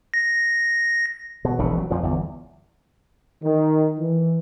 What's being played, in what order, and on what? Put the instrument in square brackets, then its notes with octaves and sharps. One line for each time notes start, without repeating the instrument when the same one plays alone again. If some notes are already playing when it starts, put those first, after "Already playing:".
[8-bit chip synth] A#6
[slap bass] B2
E1 A#1 C#3 E3
F#3
F2 A#2 F3
G1 E2
[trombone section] D#3
E3